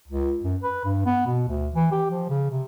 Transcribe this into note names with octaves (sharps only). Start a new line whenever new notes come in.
C#2
F#2
B4
G2
B3
B2
D2
E3
G4
F3
C#3
C3